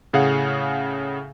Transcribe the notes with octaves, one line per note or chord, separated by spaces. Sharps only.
A2 C#3 G#4 F5 F#5